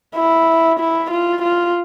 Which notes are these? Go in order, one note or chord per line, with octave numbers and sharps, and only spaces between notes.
E4
E4
F4
F4